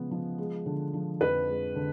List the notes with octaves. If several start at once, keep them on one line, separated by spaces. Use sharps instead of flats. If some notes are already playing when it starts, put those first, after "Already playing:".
Already playing: C#3 F3 G#3 B3
F3
G#3
D3
F3
F2 B4
G#3
D3